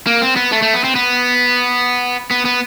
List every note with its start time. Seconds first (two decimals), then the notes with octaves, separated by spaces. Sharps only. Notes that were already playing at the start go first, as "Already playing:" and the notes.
0.07 A#3
0.21 C4
0.36 B3
0.52 A3
0.62 A3
0.74 B3
0.84 C4
0.95 B3
2.31 B3
2.45 B3